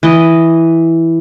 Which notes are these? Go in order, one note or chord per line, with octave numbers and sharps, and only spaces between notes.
E3 D#5